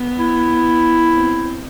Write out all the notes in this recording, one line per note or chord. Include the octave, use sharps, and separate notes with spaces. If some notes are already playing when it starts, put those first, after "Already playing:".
Already playing: B3
E4
C4